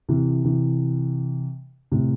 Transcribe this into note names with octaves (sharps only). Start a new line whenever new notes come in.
C3 E3
C3 E3
A2 C3